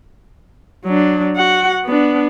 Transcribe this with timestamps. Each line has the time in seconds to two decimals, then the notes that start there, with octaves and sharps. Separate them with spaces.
0.85 F#3 D4
1.36 F#4 F#5
1.85 B3 D4